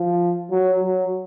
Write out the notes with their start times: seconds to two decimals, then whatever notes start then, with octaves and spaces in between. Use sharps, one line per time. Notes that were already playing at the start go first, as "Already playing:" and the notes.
Already playing: F3
0.51 F#3
0.82 F#3